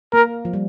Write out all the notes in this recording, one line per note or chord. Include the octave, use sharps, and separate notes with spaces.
A#3 A#4
F3
G3